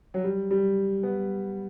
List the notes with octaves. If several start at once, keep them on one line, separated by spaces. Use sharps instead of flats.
F#3
G3
G3
B3